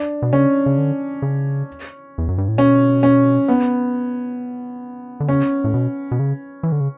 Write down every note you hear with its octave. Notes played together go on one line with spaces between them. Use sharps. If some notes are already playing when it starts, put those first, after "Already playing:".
Already playing: D4
B2
C#3 C#4
C#3
D3
C#3
E2
F#2
G2
A2
B2 C#4
C#4
B3
D3
C#3 C#4
A2
B2
B2
C#3
E3
D3
C#3